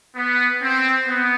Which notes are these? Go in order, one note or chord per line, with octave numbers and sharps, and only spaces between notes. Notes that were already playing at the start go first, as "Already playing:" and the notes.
B3
C4
B3